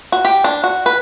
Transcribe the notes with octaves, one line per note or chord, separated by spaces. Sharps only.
F#4
G4
D4
F#4
B4